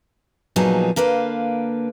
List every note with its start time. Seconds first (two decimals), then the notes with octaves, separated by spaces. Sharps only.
0.56 A#2 F3 F#3 B3 D#4 G#4
0.96 D3 A#3 B4 F5